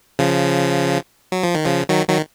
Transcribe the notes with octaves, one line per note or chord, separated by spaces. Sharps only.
C#3 F3
F#3
F3
D#3
C#3 F3
D#3 F#3
D#3 F#3